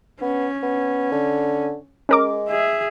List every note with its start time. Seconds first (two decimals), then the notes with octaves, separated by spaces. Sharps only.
0.21 B3 C#4
0.63 B3
1.12 D3
2.09 G#3 C#4 A#4 D6
2.49 G#4 E5